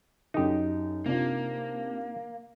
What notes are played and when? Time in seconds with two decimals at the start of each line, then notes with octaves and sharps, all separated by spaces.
0.34 F#2 D#4 G4 A4
1.06 C3 A#3 D4 F4